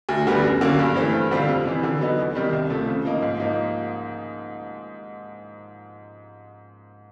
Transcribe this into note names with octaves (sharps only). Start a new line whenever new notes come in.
D2
D3 G3 B3
F#2
D3 F#3 A#3 C#4
G2
E3 A3 C4
G2
D3 G3 C4 F4
F2
C3 E3
D3
F#3 B3 D#4
E2
C3 D#3 G3
C2
C3 F3 A3
C#3
F3 A#3 D#4
G#2
F3 A#3 D#4